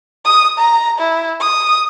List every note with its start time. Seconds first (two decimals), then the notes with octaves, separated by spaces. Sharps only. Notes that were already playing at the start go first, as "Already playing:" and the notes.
0.25 D#6
0.59 A#5
0.99 E4
1.40 D#6